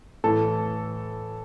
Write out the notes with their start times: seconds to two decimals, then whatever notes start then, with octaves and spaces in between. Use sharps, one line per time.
0.24 A2 E3 A4